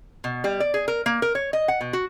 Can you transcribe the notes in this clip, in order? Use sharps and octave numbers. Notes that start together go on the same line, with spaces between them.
B2
G3
D5
G#4
A#4
A#3
A#4
C#5
D#5
F#5
B2
F#4